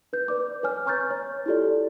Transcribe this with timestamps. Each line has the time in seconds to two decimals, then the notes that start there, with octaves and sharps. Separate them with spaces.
0.13 B4 G6
0.28 B4 D5 D6
0.63 B4 C#5 G#5 F6
0.86 G#5 A#5 C#6 F6 G6 A6
1.11 C#5
1.46 E4 F4 G4 A4 D5